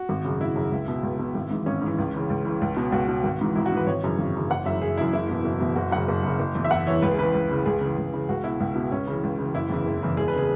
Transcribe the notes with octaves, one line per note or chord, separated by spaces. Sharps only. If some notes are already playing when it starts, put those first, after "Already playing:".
Already playing: F#4
G#1
F#2 C#3
G#1 E4
F#2 C#3
C#2
B2
C#2
B2
G#1
G#2 E3
G#1 C#4
G#2 E3
C#2
C#3 E3
C#2
C#3 E3
C#2
B2
C#2 F#4
B2
G#1
G#2 E3
G#1 E4
F#4
G#2 E3 B4
G#1 C#5
F#2 C#3 E3
G#1
F#2 C#3 E3
F#1 F#5
F#2 C#3 E3 E5
F#1 G#4
F#2 C#3 E3 E4
F#1 E4
E2 B2
F#1
E2 B2
F#1 F#4
F#2 C#3 F#5
F#1
F#2 C#3
F#1
E2 E3
E5
F#1 F#5
E2 E3 C#5
C#2 B4
G#4
C#3 E3 B4
C#2
C#3 E3
C#2 G#4
C#3 E3
C#2
C#3 E3
C#2 F#4
B2 E4
C#2
B2
C#2 C#4
C#3 E3
C#2
C#3 E3
F#1 E4
E2 C#3 E3
F#1
E2 C#3 E3
E1 G#4
B4
C#3 G#4